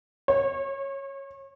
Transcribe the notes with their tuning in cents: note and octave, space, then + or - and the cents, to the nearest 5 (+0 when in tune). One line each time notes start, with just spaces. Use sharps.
C#5 -25